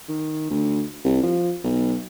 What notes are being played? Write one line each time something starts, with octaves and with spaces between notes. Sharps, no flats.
D#3
D2
C2
F3
B1